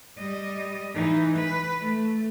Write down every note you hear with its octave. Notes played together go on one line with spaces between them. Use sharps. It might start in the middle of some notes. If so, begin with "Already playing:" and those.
G3 D#5
E3 D#4
B4
A3